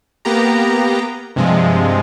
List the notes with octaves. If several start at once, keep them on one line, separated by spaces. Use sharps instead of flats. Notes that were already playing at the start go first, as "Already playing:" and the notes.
A#3 B3 G4 A#5
G2 C3 F3 G#3